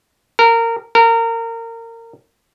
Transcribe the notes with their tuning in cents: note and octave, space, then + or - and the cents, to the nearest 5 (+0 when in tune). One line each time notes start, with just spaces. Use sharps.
A#4 -20
A#4 -25